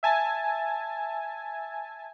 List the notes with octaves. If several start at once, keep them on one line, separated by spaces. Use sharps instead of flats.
E5 G#5 A5